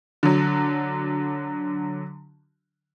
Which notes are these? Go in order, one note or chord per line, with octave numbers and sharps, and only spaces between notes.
D3 F#3